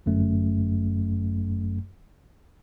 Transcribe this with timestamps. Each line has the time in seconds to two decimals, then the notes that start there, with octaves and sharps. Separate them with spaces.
0.06 G1 F#2 A3